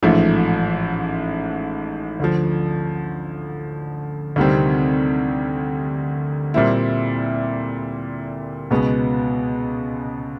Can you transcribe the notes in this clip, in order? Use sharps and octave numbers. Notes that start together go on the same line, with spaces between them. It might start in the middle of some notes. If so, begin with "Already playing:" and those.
A1 G#2 F3 A3
D2 D3 F3
D2 C3 D#3 G3 C4
A#2 G3 C4 E4
C#2 B2 G#3 B3